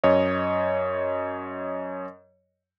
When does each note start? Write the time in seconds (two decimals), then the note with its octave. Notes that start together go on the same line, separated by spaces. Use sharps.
0.04 F#2 C#5 D#5